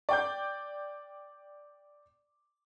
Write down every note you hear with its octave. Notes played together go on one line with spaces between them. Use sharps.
D5 G5 G6